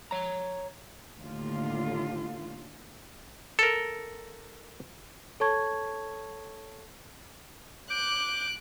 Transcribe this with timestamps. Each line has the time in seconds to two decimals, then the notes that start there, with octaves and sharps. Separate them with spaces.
0.11 C#5 A#5
1.19 D#2 A2 D3 F4
3.59 A4 A#4
5.40 A4 C#5 A5 C#6 G#6
7.90 D6 F#6 G6 D7